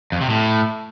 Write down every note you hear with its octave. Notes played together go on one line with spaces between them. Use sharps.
F2
C3
A2